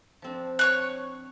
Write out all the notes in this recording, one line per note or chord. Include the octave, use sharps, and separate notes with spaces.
F3 C4 D4
C#5 C#6 F#6